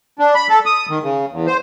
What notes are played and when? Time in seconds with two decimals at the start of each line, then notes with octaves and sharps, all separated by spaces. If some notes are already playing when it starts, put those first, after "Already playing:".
0.19 D4
0.35 B5
0.49 A4
0.66 D#6
0.90 D#3
1.03 C#3
1.32 E2
1.47 C5